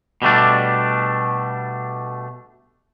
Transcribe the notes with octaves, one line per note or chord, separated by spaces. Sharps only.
B2 G3 A3 D4